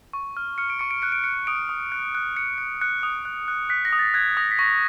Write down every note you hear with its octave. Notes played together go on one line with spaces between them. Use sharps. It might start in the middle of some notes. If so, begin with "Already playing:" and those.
C#6
F6
F6 C#7
D7
C#6 C#7
D7
F#6 C#7
D7
F#6 C#7
D#6 D7
D#6
F#6
F#6
F#6 C#7
F#6 C#7
F#6 C#7
D#6
F#6
F#6
F#6 B6
A#6
D#6
A6
F#6 G#6
D#6 A#6
B6
C#6 A#6